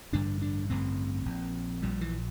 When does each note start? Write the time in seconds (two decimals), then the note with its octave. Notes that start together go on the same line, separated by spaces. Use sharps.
0.12 A1 G2 D3 D4
0.42 D4
0.69 A1 G2 D3 C4
1.25 A#1 A#2
1.82 A#1 A#2 G3
2.01 E3